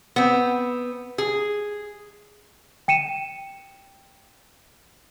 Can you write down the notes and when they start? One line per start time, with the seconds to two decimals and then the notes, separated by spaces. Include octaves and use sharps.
0.16 B3 C4
1.18 G#4
2.88 G5 C#7 D#7 E7